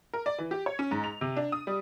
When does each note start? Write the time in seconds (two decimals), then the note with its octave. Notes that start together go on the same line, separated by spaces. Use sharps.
0.13 A#4
0.26 D5
0.38 E3
0.51 G4
0.66 C#5
0.79 C#4
0.91 G#2
1.04 F7
1.21 C3
1.37 D4
1.52 D#6
1.67 G3